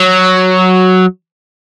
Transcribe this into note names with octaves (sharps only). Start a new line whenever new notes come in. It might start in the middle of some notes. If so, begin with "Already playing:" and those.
Already playing: F#3